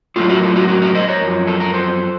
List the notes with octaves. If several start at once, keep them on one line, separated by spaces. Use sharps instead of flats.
A2 F#3 F4 A4
F#4 A#4
F4 A4
F#4 A#4
F#4 A#4
F#4 A#4
C5 D#5
A#4 C#5
F#2 F3
A4
A#4
A4 C5